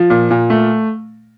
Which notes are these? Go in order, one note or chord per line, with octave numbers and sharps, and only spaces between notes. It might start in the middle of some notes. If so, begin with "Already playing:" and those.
Already playing: F3
A#2
A#2
A3